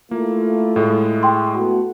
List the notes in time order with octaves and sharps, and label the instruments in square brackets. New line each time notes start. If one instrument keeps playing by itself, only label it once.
[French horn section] A3 F4 [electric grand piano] A#3 [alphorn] E4
[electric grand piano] A2 G#3
[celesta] G5 C6
[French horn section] A3 B3 F#4